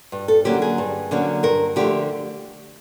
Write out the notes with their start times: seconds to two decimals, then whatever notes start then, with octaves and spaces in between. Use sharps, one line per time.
0.12 G2
0.28 A4
0.45 D3 F#3 A#3 C#4 G4
0.62 G#4
0.78 G2
1.11 D3 F#3 A#3 C#4
1.43 G2 A#4
1.76 D3 F3 A3 G4